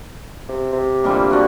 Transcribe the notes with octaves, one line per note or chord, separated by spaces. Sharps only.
C3
C3
A#2 D3 G3
D3 F#4